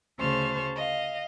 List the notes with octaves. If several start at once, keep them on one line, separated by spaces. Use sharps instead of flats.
D2 C#3 C5 A5 C#6 F6
D#5 F5